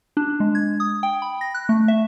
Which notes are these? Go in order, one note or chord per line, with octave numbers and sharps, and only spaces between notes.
D4
G#3
G#6
D#6
G5
B5
A#6
F#6
A3
E5